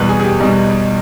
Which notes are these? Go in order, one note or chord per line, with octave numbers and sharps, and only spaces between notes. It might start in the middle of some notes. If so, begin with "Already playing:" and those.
Already playing: E2 B2 G3 B4
G#4
G#4
G4
B2 G3 D#4